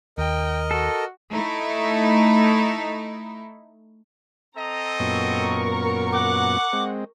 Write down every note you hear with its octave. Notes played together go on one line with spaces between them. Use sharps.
D#2 A#4 D#5 G5
F#4 A4
A3 D#4 E4
C4 A4 D#5 A#5
F#2 A#2 B3 A#4 C#6
F#5 D6
G#3 C4